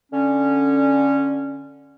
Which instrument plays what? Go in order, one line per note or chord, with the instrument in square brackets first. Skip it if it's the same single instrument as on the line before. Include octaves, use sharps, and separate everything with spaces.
[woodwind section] D3 C#4